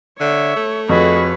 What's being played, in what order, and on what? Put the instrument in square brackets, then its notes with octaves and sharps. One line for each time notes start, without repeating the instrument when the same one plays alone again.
[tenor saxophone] D3 [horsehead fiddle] C#5 [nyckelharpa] E5
[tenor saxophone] A3
[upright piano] F2 [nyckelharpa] F#4 G#4 [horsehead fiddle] B4 C#5